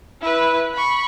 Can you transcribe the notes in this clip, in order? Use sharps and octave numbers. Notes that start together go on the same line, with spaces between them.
E4 B4
B5 C#6